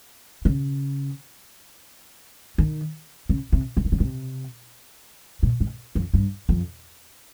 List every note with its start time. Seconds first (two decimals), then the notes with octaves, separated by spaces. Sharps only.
0.45 C#3
2.58 D#3
3.29 C#3
3.52 C3
3.77 C#3
3.85 D#3
3.92 C#3
4.00 C3
5.43 A#2
5.60 G#2
5.95 F2
6.14 G2
6.49 F2